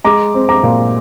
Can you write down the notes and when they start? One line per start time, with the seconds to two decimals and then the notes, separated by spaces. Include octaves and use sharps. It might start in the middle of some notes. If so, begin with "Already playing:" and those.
0.04 G#3 A#5 D6
0.34 C4
0.49 A#5 D6
0.63 A#2